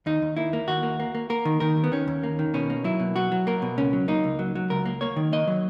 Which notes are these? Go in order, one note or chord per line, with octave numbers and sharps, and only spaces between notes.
D#2 D#4
D#2
A#3 E4
A#3
D#2 F#4
A#3
A#3
A#3
A#3 A#4
D#3
D#3 A#4
D#2
B3
D#3 C#4
D#2
A#3
D#3
B2 C#4
A#3
F#3 E4
B2
F#3 F#4
F#3
A#3 A#4
B2
C#2 C#4
F#3
A#3 D#4
C#2
F#3
F#3
C#2 A#4
A#3
A#3 C#5
D#3
A#3 D#5
F#3